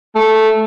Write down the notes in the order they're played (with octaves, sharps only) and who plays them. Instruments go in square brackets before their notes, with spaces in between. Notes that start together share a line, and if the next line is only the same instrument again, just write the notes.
[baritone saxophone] A3